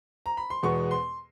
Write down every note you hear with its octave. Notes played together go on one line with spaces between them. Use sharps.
A#5
B5
C6
E2 B2 G#3 B3 C#6
C6